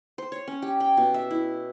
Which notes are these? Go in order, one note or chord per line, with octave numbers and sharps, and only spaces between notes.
C5
C#5
C#4
G4
G5
B2
E5
E4